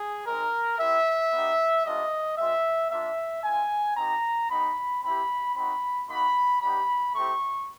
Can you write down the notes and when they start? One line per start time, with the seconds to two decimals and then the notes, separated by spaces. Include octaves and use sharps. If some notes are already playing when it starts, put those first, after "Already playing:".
Already playing: G#4
0.26 G#3 C4 D#4 A#4
0.79 C4 E4 G4 E5
1.33 B3 D#4 G4
1.85 G3 A#3 D4 F4 D#5
2.38 G#3 C4 F4 E5
2.91 A#3 D4 F4 E5
3.44 C4 F4 G#5
3.97 C4 D#4 G4 A#5
4.50 B3 D#4 G4 B5
5.03 C4 E4 G4 B5
5.56 C4 D#4 F#4 B5
6.08 A#3 D#4 F#4 B5
6.61 G3 B3 D#4 G4 B5
7.15 A3 C4 E4 G4 C#6